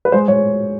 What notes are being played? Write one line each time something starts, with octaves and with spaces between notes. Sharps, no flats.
B4
G#3 C5
G#3 C#5